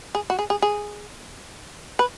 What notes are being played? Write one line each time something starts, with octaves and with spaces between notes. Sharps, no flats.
G#4
F#4
G#4
G#4
G#4
B4